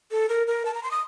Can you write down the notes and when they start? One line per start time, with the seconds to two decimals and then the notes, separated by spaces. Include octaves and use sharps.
0.11 A4
0.29 A#4
0.47 A#4
0.65 A5
0.74 A#5
0.83 C6
0.91 D#6